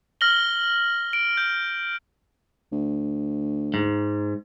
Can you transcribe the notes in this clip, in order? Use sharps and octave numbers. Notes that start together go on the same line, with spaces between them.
F6 A#6 F#7 G7
D7
G6
D2
G#2